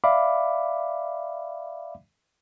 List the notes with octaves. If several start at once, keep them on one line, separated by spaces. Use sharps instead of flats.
D5 E5 F5 B5 D6